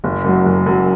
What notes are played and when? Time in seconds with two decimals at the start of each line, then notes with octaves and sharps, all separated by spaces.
0.04 F#1
0.24 F#2 F#3
0.46 F#1
0.66 F#2 F#3